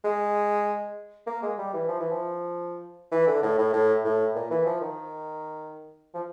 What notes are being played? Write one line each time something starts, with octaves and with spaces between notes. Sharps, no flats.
G#3
A#3
G#3
G3
E3
F3
E3
F3
E3
D3
A2
A2
A2
A2
A#2
E3
F3
D#3
F3